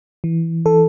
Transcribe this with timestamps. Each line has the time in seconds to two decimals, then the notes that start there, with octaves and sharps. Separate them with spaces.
0.24 E3
0.66 E3 A4